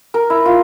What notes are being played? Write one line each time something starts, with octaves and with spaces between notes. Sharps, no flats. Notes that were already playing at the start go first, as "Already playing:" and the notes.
A#4
E4
F4